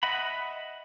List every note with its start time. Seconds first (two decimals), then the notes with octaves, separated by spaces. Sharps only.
0.03 D#5 E5 F#5 B5